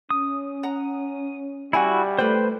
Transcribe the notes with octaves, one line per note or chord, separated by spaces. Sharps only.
C#4 D#6
F#5 A#5
G3 E4 F#4 C#5 F#5 G#5
A3 F4 B4 C5 G5